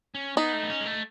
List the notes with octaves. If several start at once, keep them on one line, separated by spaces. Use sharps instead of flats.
C#4
B3 D#4
A3
B3
C#4
G#3
A3